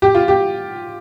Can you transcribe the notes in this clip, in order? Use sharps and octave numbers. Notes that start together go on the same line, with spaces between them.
G4
F4
G4